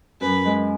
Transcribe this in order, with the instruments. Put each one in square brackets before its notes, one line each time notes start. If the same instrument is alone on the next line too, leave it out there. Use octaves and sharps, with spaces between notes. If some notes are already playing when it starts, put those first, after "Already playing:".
[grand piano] F#2 [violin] B4
[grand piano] G#3